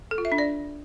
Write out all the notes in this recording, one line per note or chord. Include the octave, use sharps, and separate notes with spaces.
A4
F4
E5
D4
D5